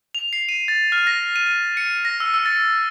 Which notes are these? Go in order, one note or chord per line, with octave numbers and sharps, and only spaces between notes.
F7
C7
D#7
A6
F6
A#6
D#7
C#7
A#6
E6
E6
A6